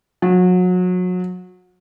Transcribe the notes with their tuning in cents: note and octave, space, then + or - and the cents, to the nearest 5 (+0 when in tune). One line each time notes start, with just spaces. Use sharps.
F#3 -30